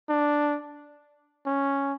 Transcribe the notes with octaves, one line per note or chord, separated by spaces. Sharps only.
D4
C#4